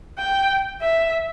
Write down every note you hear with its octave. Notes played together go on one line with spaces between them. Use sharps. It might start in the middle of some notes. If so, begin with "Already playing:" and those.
G5
E5